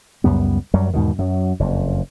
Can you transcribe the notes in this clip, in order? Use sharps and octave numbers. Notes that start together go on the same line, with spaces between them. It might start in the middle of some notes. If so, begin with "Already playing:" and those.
C#2 F#2 G3 B3
F#2 F#3 G3
E2 G#2 B2 D#3
F#2 F#3
F#1 F2